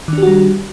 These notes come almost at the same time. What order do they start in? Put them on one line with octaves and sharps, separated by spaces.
D#3 D4 G4 F#4 G3